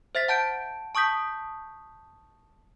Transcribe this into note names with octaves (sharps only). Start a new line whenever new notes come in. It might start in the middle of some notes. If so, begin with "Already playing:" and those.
C5 E5 A6 B6
F#5 A5 G6 D7
A5 C#6 D#6 G6 B6